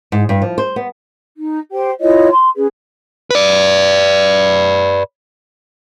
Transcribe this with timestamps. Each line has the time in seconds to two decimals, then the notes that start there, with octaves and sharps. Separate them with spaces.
0.12 G#2
0.29 G2
0.42 F3
0.58 C5
0.76 B3
1.35 D#4
1.70 G4 C5 G5
2.00 E4 F4 C#5 D#5
2.32 C6
2.55 C#4 G#4 B4
3.31 B4 D5